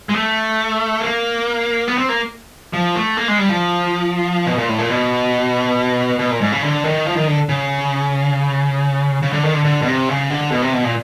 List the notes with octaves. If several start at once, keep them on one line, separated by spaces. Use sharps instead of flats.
G#3
A3
A#3
B3
C4
A#3
F3
A3
A#3
G#3
G3
F3
B2
A#2
A2
A#2
B2
B2
A#2
G#2
C#3
D3
D#3
F3
D#3
D3
C#3
C#3
D3
D#3
D3
D3
B2
C3
C#3
D3
B2
C3
B2
A#2